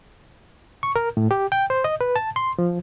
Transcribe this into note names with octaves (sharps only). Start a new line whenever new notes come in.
C#6
A#4
A2
G4
G5
C5
D#5
B4
A5
C6
F3